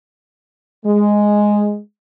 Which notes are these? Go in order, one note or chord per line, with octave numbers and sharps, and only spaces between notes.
G#3